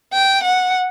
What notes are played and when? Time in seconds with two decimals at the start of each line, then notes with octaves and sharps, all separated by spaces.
0.13 G5
0.43 F#5